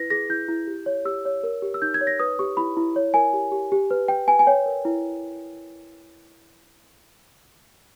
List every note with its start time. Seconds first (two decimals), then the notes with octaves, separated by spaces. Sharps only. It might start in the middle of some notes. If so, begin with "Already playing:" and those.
Already playing: E4 B4 A#6
0.10 G#4 A#6
0.30 E4 G6
0.49 E4
0.67 G4
0.86 C#5
1.05 G4 E6
1.25 C#5
1.43 A#4
1.62 G4
1.74 E6
1.82 D#4 G6
1.94 G#6
2.01 C#5
2.07 A#6
2.19 B4 D#6
2.39 G4 C#6
2.57 E4 B5
2.77 E4
2.96 C#5
3.14 A#4 G#5
3.33 G4
3.52 G4
3.72 G4
3.91 B4
4.08 G4 G5
4.27 B4 G#5
4.39 G#5
4.47 C#5 G5
4.66 A#4
4.85 E4